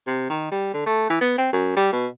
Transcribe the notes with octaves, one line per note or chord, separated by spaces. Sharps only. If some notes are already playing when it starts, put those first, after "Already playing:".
C3
D#3
G3
D3
A3
E3
B3
C4
F#2
G3
B2